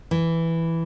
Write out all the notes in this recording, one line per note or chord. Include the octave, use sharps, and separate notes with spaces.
E3